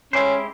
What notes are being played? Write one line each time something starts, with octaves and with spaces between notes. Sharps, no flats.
G#3 C#4 E4 G4 C5